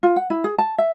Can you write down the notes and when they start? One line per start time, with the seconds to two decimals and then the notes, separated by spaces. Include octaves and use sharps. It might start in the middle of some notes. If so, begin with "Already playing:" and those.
0.03 F4
0.16 F#5
0.30 E4
0.44 G#4
0.58 A5
0.78 E5